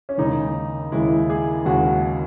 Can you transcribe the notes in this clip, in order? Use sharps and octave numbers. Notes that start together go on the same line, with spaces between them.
C#4
D#2 C#3 G#3 D#4
D#2 C#3 G#3 E4
G#4
D#2 C#3 G#3 F#4